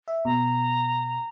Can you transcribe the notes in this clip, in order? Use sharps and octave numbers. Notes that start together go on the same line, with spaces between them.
E5
B2 A#5